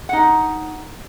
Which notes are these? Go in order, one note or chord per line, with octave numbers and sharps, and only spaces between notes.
D#4 F#5